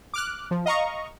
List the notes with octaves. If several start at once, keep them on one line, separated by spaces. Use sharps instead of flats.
D6 F6 F#6
F3
D#5 F5 A#5 C#6